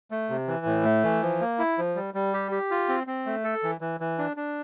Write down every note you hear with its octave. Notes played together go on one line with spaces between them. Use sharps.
A3
C3
E3
A2
A3
E3
F3
A#3
E4
F3
G3
G3
G4
G4
F4
C4
C4
A3
A4
E3
E3
E3
D4
D4